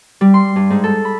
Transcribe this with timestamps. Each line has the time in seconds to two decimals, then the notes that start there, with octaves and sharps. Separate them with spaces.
0.21 G3
0.34 C6
0.56 G2
0.70 G#2
0.84 A4
1.05 B5